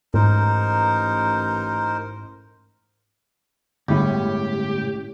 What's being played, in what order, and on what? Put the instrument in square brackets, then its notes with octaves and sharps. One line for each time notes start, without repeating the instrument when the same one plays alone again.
[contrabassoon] A1 [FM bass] G#2 [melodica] D#4 A#4 C5
[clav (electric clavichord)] G1 [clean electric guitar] A2 C#4 [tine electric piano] G#3 E4 [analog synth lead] G4